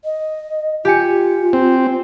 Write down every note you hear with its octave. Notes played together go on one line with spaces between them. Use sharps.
D#5
F4 G4 G#5 C#7
C4